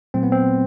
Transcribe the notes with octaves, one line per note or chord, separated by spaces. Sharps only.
A#2 F#3 A3 C4
B3
C4